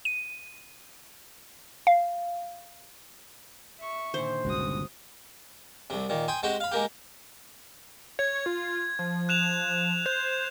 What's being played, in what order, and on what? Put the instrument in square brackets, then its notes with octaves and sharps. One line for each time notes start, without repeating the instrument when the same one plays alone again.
[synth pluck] D#7
F5
[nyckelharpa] E5 C#6
[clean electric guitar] A#2 D3 D#3 [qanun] C5
[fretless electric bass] G1 C#2 [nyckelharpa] F#4 D#6
[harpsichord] C2 C3
A#2 D#3
G5 G#5 C6 D#6
G#3 C4 F#4 G4
F5 B5
G#3 A#3 G4
[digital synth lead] C#5 [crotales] G#6
[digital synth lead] F4
F3
[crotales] F#6 E7 F7
[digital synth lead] C5 [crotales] G6